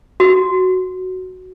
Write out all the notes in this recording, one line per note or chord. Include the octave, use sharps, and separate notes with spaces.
F#4